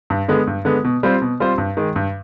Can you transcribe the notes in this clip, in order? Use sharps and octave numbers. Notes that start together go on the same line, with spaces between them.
G2
D3 G#3 B3
G2
D3 G#3 B3
B2
G3 C4 F4 C5
B2
G3 C4 F4 C5
G2
D#3 G#3
G2